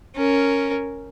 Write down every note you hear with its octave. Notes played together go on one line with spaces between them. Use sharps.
C#4 A#4